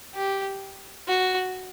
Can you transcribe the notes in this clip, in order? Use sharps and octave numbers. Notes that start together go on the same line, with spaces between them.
G4
F#4